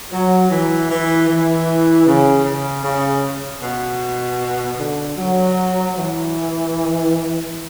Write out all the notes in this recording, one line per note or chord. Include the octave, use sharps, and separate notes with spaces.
F#3
E3
E3
E3
C#3
C#3
C#3
B2
D3
F#3
E3